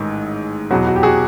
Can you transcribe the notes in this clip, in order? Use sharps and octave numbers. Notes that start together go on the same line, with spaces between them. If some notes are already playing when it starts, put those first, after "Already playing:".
Already playing: A1 G#2 D#3
E2 B2 F#3 F#4
F#4
G4
F#4 G#4